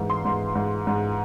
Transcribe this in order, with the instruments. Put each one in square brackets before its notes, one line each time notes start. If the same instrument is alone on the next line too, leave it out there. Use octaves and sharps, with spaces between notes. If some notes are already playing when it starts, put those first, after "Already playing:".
Already playing: [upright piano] G#2 E3
C6
G#2
G#2
G#2